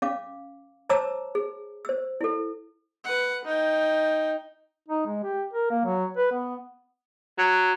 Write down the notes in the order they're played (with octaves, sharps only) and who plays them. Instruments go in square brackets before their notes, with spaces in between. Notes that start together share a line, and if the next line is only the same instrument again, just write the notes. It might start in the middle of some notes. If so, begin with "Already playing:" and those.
[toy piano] C#4 F5 D6
C5 C#5 A5 A#5 D6 E6
G#4
C5 E6
E4 A4
[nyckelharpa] B4 F#5
D#4 G5
[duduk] D#4
G#3
G4
A#4
A#3
F#3
B4
B3
[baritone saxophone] F#3